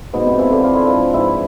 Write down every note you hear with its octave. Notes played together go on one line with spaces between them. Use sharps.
G#2 B2 B3
C3 C4
E3 F3 E4
D3 D4
F3 F4
E4
G#2 F3 F4
G#2 E3 E4